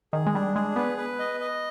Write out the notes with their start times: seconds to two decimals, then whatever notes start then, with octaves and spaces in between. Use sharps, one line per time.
0.13 D#3 G#4
0.27 G#3
0.35 G3 D4
0.56 G#3 G#4
0.76 B3 B4
0.98 B4
1.19 D#5
1.40 D#5